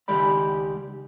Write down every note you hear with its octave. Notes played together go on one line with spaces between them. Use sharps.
C#2 D#3 G#3 G4 D5 B5